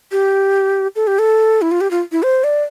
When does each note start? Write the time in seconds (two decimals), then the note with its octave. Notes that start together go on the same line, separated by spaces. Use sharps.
0.12 G4
0.96 A4
1.07 G4
1.19 A4
1.62 E4
1.71 F4
1.81 G4
1.91 F4
2.12 E4
2.23 C5
2.44 D5